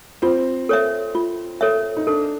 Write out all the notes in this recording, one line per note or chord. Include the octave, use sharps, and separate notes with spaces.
C4 F4
A4 C#5 E5
F4
A4 C#5 E5
D#4
D4 A4